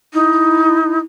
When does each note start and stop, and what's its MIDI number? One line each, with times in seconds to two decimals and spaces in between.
0.13 0.99 63
0.13 1.03 64